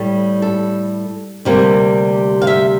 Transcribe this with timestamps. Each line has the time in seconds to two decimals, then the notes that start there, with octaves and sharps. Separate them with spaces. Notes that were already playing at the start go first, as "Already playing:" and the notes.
Already playing: A2 G3
0.42 A4
1.45 D2 C3 G3 A#3
2.42 F5
2.47 E5